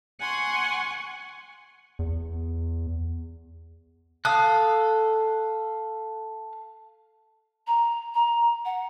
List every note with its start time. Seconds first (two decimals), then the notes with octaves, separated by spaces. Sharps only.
0.19 F#5 G#5 C6 C#6
1.99 E2
4.25 A4 F5 A5 D#6 F#6
7.67 A#5
8.14 A#5
8.65 F#5